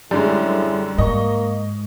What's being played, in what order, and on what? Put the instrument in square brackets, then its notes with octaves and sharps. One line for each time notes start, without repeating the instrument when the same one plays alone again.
[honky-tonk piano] F#2 D3 G#3 [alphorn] A2 [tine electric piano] G3 D5
[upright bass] G#2 [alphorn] A#3 [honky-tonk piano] D#5 C#6